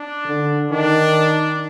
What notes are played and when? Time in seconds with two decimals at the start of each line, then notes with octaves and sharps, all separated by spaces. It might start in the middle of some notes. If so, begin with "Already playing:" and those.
Already playing: D4
0.26 D3
0.71 D#3 D4